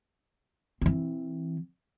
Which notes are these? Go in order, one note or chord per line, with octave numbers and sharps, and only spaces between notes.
E3 C4